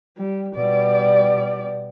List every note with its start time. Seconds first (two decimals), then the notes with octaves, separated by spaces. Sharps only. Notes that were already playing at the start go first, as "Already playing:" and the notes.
0.18 G3
0.56 B2 G3 D5